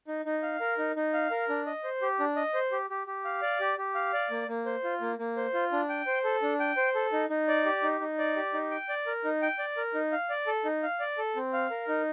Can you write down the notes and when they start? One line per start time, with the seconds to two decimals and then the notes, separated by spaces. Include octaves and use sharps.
0.08 D#4
0.25 D#4
0.43 F5
0.60 A#4
0.78 D#4
0.96 D#4
1.14 F5
1.31 A#4
1.49 D4
1.66 D#5
1.84 C5
2.02 G4
2.20 D4
2.36 D#5
2.54 C5
2.72 G4
2.90 G4
3.07 G4
3.25 F5
3.42 D5
3.60 G4
3.78 G4
3.95 F5
4.13 D5
4.30 A#3
4.48 A#3
4.66 C5
4.84 F4
5.01 A#3
5.19 A#3
5.37 C5
5.54 F4
5.72 D4
5.89 G5
6.07 C5
6.24 A4
6.42 D4
6.60 G5
6.77 C5
6.95 A4
7.13 D#4
7.30 D#4
7.48 D5
7.65 G4
7.83 D#4
8.01 D#4
8.19 D5
8.36 G4
8.54 D#4
8.71 G5
8.89 D5
9.06 A#4
9.25 D#4
9.42 G5
9.59 D5
9.77 A#4
9.94 D#4
10.12 F5
10.30 D5
10.47 A4
10.65 D#4
10.83 F5
11.00 D5
11.18 A4
11.36 C4
11.53 F5
11.71 A#4
11.88 D#4